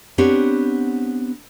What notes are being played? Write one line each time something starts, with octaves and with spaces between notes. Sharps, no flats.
B3 C4 D4 G4 C#5